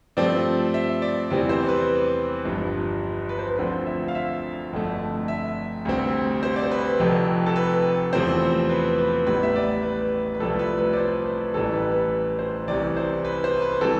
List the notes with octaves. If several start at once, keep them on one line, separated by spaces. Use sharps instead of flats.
G2 F3 A3 C4 D5
E5
D5
E2 C3 E3 G3 C4 D5
C5
B4
G1 G2 F3
B4
C5
B4
D2 D3 F3 C4
E5
F5
E5
G1 F2 D3 A3
E5
D2 C3 G3 C4
C5
D5
C5
B4
F1 F2 C3 F3
A4
B4
E2 C3 F3 A3 C4 C5
B4
B4
A1 A2 G3 B3 B4
E5
D5
B4
B4
C2 C3 F3 A3 A4
B4
B4
D5
C5
B4
A1 A2 E3 G3 A4
B4
B4
C5
C2 C3 E3 D5
C5
B4
C5
B4
E3 G3 C4 A4